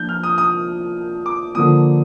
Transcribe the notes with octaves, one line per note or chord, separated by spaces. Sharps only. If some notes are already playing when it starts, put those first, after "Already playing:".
Already playing: F3 A#3 D4 G6
F6
D#6
D#6
D6
D3 F3 A#3 D#6